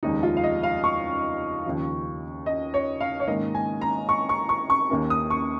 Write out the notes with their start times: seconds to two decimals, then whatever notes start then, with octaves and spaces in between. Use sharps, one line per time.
0.03 F1 D#2 C#3 G#3 D#4
0.23 F4
0.37 F5
0.44 D#5
0.63 F5
0.84 C#6
1.65 D#2 C#3 F3
2.46 D#5
2.74 C#5
3.01 F5
3.20 C#5
3.27 G#2 D#3 A#3 C#4 D#5
3.55 G#5
3.81 A#5
4.09 C#6
4.29 C#6
4.49 C#6
4.70 C#6
4.90 D#2 D#3 A#3 C#4
5.10 D#6
5.30 C#6